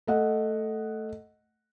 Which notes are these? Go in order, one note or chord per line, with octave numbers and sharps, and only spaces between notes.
A3 D#5 F#5